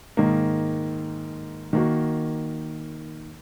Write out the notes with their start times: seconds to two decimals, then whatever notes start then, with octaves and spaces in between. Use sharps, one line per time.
0.17 G#2 D#3 A#3
1.73 D#3 A#3 F#4